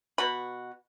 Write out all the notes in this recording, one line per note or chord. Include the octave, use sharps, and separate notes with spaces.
B2 F#4 B5